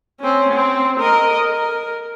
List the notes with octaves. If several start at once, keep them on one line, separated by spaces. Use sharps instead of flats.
C4 C#4
C4
A#4 D#5
A#4